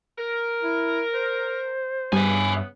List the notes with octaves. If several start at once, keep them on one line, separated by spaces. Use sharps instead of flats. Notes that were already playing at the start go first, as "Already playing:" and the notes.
A#4
E4
C5
G2 C#3 B3 E5 G#5